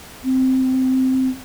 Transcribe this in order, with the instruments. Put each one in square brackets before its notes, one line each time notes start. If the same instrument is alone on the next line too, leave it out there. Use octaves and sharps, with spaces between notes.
[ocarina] C4